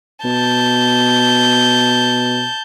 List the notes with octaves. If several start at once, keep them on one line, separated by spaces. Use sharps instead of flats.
B2 A5 G6